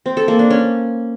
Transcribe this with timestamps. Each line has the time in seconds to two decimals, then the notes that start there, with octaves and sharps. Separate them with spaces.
0.06 C4
0.17 A4
0.28 A#3
0.39 D4
0.50 C#4